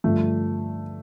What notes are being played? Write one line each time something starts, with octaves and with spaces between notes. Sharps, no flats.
G2 D3 F3 A3